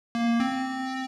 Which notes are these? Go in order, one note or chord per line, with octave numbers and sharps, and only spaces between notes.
A#3
C4